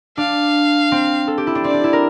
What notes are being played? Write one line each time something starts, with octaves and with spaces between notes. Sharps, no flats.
D4 F5
C4
A4
G4
E4
D4
C4 D5
D4
E4
A#4